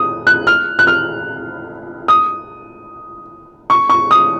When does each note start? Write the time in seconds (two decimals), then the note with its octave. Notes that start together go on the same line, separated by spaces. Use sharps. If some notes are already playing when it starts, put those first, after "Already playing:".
Already playing: D#6
0.27 F#6
0.47 F6
0.79 F#6
0.87 F6
2.08 D#6
3.70 C#6
3.89 C#6
4.11 D#6